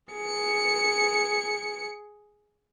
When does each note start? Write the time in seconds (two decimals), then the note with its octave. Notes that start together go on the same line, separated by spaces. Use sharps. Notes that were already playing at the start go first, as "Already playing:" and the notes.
0.13 G#4 C#7